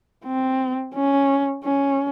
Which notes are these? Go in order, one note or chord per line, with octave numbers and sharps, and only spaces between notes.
C4
C#4
C#4